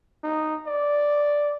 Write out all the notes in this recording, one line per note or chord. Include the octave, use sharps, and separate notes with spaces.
D#4
D5